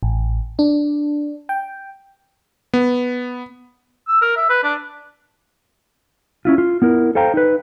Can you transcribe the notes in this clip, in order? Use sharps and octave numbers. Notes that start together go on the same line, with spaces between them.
A1
D4
G5
B3
E6
A#4
E5
B4
D4
C#4 E4 F4
F4
B3 E4 A#4
A4 C5 F5 G5 A#5
D#4 B4